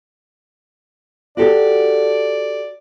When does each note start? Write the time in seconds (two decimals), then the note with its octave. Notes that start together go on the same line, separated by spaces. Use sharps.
1.37 F#4 G4 A4 D5